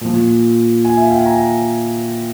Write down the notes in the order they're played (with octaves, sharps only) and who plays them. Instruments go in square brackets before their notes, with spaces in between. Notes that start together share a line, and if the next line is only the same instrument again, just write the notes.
[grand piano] A#2 F3
G#5
E5
F5
G5
G#5
A#5